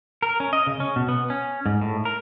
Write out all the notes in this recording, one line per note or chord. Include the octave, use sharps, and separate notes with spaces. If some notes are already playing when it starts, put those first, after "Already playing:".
A#4
C#4
D#5
C#3
C#4
B2
B3
C#4
G#2
A2
A#4